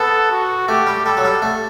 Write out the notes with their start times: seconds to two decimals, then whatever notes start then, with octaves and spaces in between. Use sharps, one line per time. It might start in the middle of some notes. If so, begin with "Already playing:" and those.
Already playing: B3 A4
0.31 F#4
0.68 A3 G4
0.87 G3
1.05 G3 A4
1.17 F#3
1.25 G3
1.42 A3